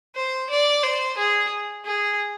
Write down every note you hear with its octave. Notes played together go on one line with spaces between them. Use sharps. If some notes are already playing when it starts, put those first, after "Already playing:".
C5
D5
C5
G#4
G#4